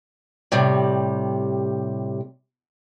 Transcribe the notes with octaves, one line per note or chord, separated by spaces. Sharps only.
A2 C3 G3